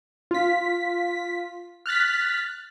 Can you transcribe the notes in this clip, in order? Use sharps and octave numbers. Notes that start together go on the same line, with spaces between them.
F4 B6
F6 F#6 A6 B6